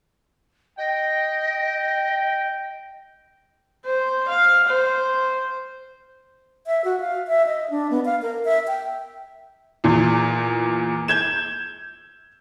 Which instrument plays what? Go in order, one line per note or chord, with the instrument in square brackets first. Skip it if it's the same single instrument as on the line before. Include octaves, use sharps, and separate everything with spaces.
[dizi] D#5 [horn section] G5
[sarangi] C5
F5
C5
[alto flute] E5
F#4
F5
E5
D#5
D4
B3
F5
A#4
E5
G5
[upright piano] E2 A#2
G6 G#6 E7